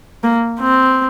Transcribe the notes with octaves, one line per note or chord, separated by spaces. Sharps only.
A#3
C4